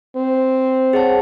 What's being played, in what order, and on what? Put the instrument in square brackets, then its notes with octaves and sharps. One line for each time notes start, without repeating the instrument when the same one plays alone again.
[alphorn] C4
[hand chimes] G#4 C#5 F#5 A5